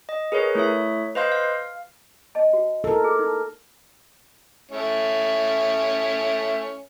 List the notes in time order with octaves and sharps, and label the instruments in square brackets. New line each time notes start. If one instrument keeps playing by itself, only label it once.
[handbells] D#5
G#4 A#4 B4 C#5
A3 E4 C#5 E5
B4 C5 D#5 F5 C6 G6
F5
[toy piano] D#5 A5
F#4
[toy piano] D#4 E4 E6 [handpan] A4 A#4
[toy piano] G#4
D#4
[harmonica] A3 C#4 E4